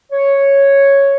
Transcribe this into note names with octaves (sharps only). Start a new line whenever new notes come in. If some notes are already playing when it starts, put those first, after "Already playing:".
C#5